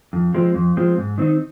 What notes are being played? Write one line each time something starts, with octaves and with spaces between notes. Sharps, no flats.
F2
F3 G#3 C4
F2
F3 G#3 C4
G#2
D#3 C4 D#4